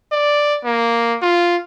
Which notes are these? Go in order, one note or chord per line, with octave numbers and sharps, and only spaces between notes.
D5
A#3
F4